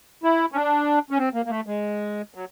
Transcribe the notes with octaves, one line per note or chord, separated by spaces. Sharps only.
E4
C#4
D4
C#4
C4
A#3
A#3
A3
G#3
F#3